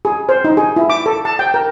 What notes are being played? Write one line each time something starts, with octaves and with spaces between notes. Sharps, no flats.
G#4
C5
D#4
G#4
E4
D6
A4
A5
G5
A#4